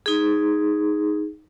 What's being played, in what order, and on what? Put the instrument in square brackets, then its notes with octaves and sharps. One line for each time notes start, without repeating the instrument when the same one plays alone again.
[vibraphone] D#4 G#4